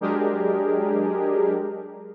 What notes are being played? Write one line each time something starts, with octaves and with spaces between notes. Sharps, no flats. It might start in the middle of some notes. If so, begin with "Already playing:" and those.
F#3 G#3 D4 G4 G#4 A#4